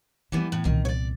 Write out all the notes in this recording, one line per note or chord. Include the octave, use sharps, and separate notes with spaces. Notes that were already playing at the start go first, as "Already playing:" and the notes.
E3 G3 A#3 B3
A2
C2 A#2 D#3
C#5 D5